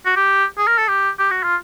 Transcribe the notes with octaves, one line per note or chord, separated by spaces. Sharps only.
F#4
G4
G#4
A#4
A4
G4
G4
F#4
F4